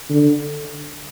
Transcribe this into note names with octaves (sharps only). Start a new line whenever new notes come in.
D3